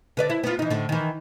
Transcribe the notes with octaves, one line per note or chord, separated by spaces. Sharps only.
D3 B4 D5
E4
B3 F4
E3 D#4
A2 D3
D#3 E3